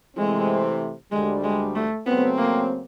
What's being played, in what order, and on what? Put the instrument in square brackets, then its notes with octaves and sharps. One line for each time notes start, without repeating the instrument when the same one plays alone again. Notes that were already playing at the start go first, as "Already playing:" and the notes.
[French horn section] C3 E3 A3 C4 [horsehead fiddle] G#3
[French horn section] D2 D3 G3 [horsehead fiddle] G#3
[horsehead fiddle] G#3
A3
[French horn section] C#3 F#3 A3 C4 [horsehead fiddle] B3
[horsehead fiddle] A#3